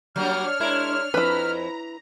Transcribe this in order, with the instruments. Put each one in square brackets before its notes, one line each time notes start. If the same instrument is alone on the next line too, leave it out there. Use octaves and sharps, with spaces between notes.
[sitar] F#3 G3 A#3 [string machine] D4 C#5 [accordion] F6
[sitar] G#3 E4 A#4
[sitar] F2 [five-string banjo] E4 B4 [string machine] A#5